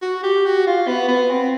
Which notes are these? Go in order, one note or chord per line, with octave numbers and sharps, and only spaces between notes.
F#4
G4
F#4
F4
B3
B3
C4